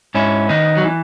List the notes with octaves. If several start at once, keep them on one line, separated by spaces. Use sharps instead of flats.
G#2 C#4 E4
D#3 B3 D#4
F#3
E3